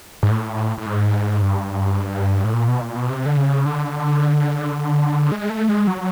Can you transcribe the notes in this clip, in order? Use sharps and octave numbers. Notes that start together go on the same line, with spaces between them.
G#2
A2
A2
G#2
G2
A2
A#2
B2
A#2
B2
C3
D3
C#3
D3
G#3
A3
G#3
F#3